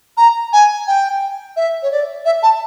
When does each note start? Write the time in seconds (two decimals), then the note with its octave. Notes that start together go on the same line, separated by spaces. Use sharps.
0.17 A#5
0.53 G#5
0.87 G5
1.56 E5
1.82 C#5
1.92 D5
2.25 E5
2.43 A5